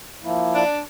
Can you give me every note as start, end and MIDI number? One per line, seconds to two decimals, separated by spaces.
0.23 0.64 53
0.23 0.64 58
0.23 0.64 64
0.55 0.79 62